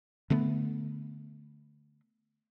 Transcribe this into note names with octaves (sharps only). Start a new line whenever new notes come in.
D3 A3 B3